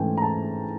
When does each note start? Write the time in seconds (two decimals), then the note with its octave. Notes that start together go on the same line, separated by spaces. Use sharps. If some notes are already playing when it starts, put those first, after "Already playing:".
Already playing: G#2 E3 A3 C#4 G5 G#5
0.17 A#5
0.22 A5